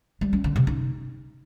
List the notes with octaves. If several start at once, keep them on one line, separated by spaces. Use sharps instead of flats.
G3
C#4
D3
C3
D#4